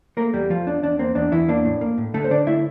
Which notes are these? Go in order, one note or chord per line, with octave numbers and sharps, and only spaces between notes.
A3 A#3 A#4
E2 G3 G4
F3 A3 F4
E2 D4
E2 D4
A#3 C4
E2 D4
E2 E3 E4
A#3 D4
A2
A#3
A2
D3 A3 A4
C5
D3 D4 D5
A3 E4 E5